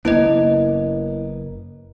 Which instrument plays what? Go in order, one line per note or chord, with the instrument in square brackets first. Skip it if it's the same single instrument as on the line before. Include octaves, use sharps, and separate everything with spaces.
[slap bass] F#1 A#3 B3 [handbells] E4 D#5